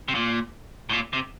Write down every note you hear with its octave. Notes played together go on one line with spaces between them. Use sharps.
C3
A#2
A2
A#2
C3